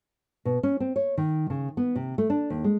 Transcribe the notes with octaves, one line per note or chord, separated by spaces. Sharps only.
B2
C#4
C4
C#5
D#3
C#3
B3
C3
A3
D4
D#2
G#3